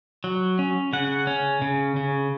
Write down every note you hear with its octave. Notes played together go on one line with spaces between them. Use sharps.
F#3
C#4
C#3 F#5
C#4
C#3
C#3